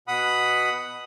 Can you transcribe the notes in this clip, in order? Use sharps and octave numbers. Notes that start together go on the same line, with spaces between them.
B2 F#5 B5 D#6